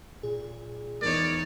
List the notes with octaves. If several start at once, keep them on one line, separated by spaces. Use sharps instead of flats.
A#2 G#4
E2 D#4 A#4 C#5 D5